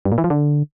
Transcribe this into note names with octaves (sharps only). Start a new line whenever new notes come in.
G2
A#2
E3
F3
D3